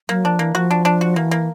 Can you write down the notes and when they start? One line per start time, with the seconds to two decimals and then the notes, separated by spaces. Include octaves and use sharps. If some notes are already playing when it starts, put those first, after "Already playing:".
0.09 F#3 A#3
0.25 F3 D4
0.39 E3 A#3
0.55 F3 F#4
0.71 D4
0.85 D4
1.01 F#4
1.16 E3 A#3
1.31 A#3